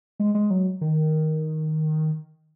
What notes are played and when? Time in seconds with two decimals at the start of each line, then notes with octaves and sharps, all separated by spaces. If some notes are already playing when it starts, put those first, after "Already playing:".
0.19 G#3
0.35 G#3
0.50 F#3
0.81 D#3